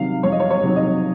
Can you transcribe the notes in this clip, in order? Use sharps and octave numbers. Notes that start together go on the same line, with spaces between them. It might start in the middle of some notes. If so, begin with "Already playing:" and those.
Already playing: C3 D#3 F#3 F5
F2 C#5
D#5
C#5
C#5
C3 D#3 F#3
D#5